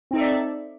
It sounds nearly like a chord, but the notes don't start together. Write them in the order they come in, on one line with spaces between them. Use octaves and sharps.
C4 D#4 A4 E5 D5